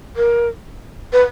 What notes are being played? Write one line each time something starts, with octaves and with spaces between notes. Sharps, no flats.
A#4
B4